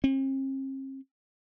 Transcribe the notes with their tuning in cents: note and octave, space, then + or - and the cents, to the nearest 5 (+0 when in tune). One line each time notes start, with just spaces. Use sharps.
C4 +45